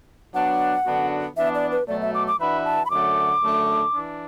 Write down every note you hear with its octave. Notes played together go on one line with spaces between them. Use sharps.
F#3 B3 D4 F#5
F#2 D3 B3 D4 F#4
E3 B3 D4 E5
D5
B4
B2 F#3 A3 D5
E5
D6
D6
E3 D4 F#4 B4 E5 B5
A5
B5
F#2 D3 F#3 A3 D6
F#2 D3 A3 D4
E3 D4